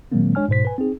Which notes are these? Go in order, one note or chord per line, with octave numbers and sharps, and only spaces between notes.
A#2 D#3 F#3 G#3 A#3 C4
G#3 D4 C#5 G#5 F6
G#2 B2 C5 B6
B4 G#5
C4 D#4 G#4